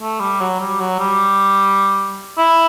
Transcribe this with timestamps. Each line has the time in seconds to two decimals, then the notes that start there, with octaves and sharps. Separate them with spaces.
0.01 A3
0.20 G3
0.40 F#3
0.60 G3
0.80 F#3
0.99 G3
2.38 E4